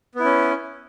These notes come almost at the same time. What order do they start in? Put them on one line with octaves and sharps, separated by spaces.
B3 E4 C#4